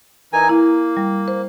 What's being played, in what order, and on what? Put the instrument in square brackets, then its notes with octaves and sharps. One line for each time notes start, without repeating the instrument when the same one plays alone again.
[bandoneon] E3 D#4 G#5 [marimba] A#4
[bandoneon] A#3 [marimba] E4
[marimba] G3
C5